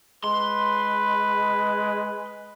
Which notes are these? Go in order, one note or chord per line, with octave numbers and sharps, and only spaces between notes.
G#3 B4 C6